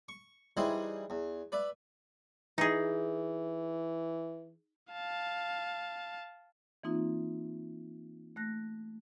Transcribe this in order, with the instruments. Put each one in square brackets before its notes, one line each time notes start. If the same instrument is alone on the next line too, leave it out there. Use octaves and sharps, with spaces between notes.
[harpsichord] C#6
E3 G3 D#4 E4 G#4 C5
E2
B4 D5 E5
[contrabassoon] E3 [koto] D#4 G#4
[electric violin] F5 A5
[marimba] E3 A#3 C4 D#4 F4
A3 F#6 A#6